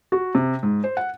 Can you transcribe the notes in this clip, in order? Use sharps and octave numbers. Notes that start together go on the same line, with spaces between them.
F#4
C3
G#2
C5
F#5